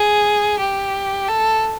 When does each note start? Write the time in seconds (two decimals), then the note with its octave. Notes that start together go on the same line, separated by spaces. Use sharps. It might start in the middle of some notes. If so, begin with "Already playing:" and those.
Already playing: G#4
0.59 G4
1.28 A4